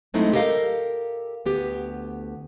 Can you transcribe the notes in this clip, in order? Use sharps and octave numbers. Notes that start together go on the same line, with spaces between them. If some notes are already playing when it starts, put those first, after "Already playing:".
F#3 G#3 A3 C4 D#4 E4
G4 A4 A#4 D#5 F5
D2 B3 G4